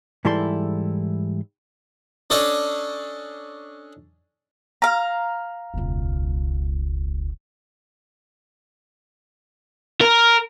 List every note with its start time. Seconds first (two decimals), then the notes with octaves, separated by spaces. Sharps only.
0.25 G#2 E3 G3 E4 A4 C6
2.30 C#4 D4 A4 D5 D#5
4.82 F5 A#5
5.74 E1 C#2
10.01 A#4